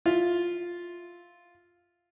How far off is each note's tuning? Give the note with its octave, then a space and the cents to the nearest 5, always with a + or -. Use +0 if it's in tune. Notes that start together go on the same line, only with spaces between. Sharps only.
F4 +0 E5 +0